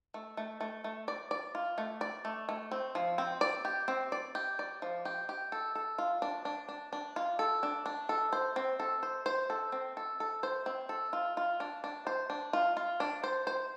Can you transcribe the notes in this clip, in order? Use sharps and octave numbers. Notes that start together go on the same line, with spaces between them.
A3
A3
A3
A3
D5
D5
F4
A3
D5
A3
A3
C4
F3
C4
D5
G4
C4
D5
G4
D5
F3
G4
G4
A4
A4
F4
D4
D4
D4
D4
F4
A4
D4
D4
A4
C5
C4
A4
C5
C5
A4
C4
A4
A4
C5
C4
A4
F4
F4
D4
D4
C5
D4
F4
F4
D4
C5
C5